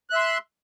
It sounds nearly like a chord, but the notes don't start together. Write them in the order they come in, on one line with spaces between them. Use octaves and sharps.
F#6 E5 C6